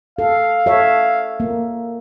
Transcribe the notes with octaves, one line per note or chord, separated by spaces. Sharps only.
A4 F5
A4 C#5 E5
A#3